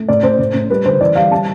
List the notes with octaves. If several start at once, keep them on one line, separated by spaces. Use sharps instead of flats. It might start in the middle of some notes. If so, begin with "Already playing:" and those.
Already playing: A3
A2 D5
A2 C5
A2
A2
G3 B4
D3 C5
E3 D5
G3 F5
G3 A5